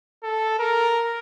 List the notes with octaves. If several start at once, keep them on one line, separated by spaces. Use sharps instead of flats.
A4
A#4